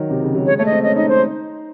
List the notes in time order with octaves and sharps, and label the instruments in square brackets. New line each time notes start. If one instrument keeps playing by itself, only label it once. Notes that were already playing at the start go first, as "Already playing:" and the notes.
Already playing: [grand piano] D#3 F#3
C3
C#3
F#3
[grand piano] G#3 [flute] C#5
[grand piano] A3 [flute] C#5
[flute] D#5
[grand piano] C4
[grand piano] C#4 [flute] D#5
[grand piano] D#4 [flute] D#5
[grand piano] D#4 [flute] C5